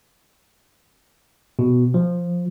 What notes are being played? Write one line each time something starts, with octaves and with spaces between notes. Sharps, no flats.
B2
F3